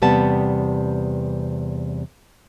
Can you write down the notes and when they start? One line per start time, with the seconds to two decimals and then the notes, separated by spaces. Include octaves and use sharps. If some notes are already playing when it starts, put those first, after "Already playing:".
0.02 E2 C3 G3 B3 A5